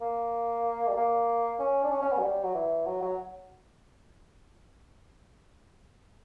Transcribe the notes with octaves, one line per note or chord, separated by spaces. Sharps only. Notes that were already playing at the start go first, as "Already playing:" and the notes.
A#3
G3
A#3
C#4
D4
C#4
C#4
B3
F#3
G3
F#3
E3
F#3
F#3